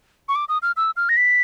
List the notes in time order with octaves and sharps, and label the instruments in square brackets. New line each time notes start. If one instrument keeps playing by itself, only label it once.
[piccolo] C#6
D6
D#6
F6
E6
F6
A#6
B6